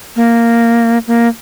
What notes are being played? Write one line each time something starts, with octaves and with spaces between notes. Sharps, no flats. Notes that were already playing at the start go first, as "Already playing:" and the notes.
A#3
A#3